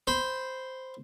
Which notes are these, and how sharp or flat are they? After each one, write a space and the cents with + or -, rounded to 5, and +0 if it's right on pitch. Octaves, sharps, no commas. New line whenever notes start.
C5 -5 B5 +0